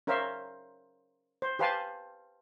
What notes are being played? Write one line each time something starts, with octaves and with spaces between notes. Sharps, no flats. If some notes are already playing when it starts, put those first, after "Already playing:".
C#4 A#4 C5 E5 F5
C5
G4 B4 C5 F5 G#5 A5